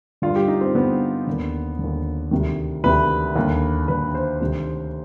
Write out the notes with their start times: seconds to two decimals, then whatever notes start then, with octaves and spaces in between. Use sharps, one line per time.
0.22 G2 D3 F4
0.36 G4
0.48 D#4
0.61 C4
0.74 G2 D3 B3
1.27 D#2 D3
1.79 D#2 D3
2.31 D2 C3 D#3
2.84 D2 C3 D#3 B4
3.36 D#2 D3
3.88 D#2 D3 B4
4.15 C5
4.41 D2 C3 D#3